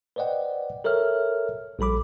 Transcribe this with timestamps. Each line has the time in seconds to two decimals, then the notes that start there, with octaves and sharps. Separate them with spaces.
0.16 B4 C5 D5 D#5 F#5 G5
0.84 A4 A#4 C#5 E5 F6
1.79 A#1 G3 A4 B5 D6